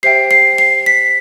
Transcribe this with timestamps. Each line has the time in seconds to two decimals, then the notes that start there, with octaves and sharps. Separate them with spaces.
0.03 G4 C5 E5 G5 C7
0.31 C7
0.58 C7
0.86 B6